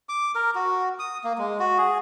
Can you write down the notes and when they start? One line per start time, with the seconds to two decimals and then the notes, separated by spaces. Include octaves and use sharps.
0.09 D6
0.35 A#4
0.55 F#4
0.99 D#6
1.24 A#3
1.38 G#3
1.59 F#4
1.78 G#4